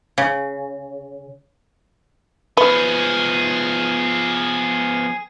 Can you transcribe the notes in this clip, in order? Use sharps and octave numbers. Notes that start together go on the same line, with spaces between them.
C#3
F3 B3 G#4 B4